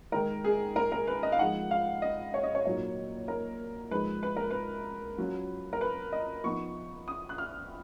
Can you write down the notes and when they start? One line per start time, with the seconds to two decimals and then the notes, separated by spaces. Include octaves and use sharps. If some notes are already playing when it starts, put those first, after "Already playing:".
0.12 D#3 G#3 D#4 A#4
0.44 G#4
0.76 A#4
0.92 A#4
1.07 B4
1.23 D#5
1.32 F5
1.38 F3 G#3 D#4 F#5
1.71 F5
2.02 D#5
2.34 C#5
2.43 D#5
2.55 C#5
2.65 A#2 F#3 A#3 D#4 C#5
3.28 A#4
3.91 F3 G#3 D#4 B4
4.23 B4
4.36 A#4
4.50 B4
5.18 F#3 C#4 F4
5.73 A#4
5.81 B4
6.12 D#5
6.44 F3 B3 D#4 C#6
7.08 D#6
7.29 F#6
7.38 F6